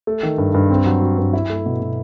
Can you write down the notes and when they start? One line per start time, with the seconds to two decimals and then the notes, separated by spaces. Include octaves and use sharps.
0.07 A3
0.23 D#3
0.38 G2
0.54 G2
0.70 C4
0.86 F#3
1.01 F#4
1.18 G2
1.33 E4
1.50 A3
1.66 B2
1.81 B2